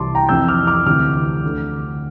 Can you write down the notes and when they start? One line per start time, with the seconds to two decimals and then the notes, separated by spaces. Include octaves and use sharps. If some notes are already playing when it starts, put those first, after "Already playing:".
Already playing: C2 C3 E3 A5 C6 D6
0.15 G5 A#5
0.29 F2 C3 E3 E6 G6
0.48 D6 F6
0.67 D6 F6
0.86 D2 C3 E3 D6 F6
1.43 D2 D3